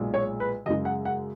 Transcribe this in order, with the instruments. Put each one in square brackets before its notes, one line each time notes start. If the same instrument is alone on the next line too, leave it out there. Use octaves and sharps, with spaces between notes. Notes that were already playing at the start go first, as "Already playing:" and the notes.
Already playing: [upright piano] B1 A#2 G#3
C#5
B4
F#2 C#3 G#3 D#5
F#5
F#5